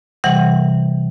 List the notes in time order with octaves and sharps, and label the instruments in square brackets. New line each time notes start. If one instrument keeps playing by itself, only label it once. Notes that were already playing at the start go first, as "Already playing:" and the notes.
[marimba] C3 E3 G3 F#5